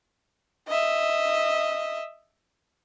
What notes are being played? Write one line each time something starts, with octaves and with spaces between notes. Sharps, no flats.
D#5 E5